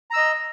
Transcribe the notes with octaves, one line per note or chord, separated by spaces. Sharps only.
D#5 A#5 E6